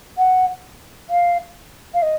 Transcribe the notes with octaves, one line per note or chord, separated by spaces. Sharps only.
F#5
F5
F5
D#5